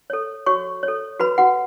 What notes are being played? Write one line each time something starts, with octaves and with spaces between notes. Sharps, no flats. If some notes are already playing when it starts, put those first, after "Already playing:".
A4 C#5
F#4 C#5 C#6
C#5
A4
F#4 B4 B5
F#4 F#5